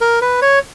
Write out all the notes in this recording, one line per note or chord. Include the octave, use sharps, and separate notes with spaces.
A#4
B4
C#5